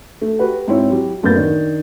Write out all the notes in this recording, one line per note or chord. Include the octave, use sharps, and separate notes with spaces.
A3
F#4 G4 B4
G#2 C4 E4 C#5
F#3 E4 G4
F#2 A2 A#3 B3 G6 A6
D#3 D4